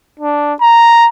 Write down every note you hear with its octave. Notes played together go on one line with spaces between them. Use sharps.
D4
A#5